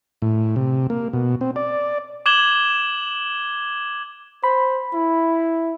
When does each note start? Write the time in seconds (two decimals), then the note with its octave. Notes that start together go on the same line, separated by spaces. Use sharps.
0.22 A2
0.56 C3
0.90 A#3
1.13 B2
1.41 C4
1.56 D5
2.26 D6 F#6 G#6 E7 F#7 G7
4.44 C5 B5
4.94 E4